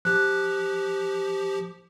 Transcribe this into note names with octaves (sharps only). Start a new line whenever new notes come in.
F3 G4 F#6